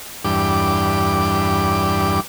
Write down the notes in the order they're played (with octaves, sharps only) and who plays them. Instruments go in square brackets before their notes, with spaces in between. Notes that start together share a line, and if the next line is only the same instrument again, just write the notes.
[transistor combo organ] E2 G2 D4 G4 D6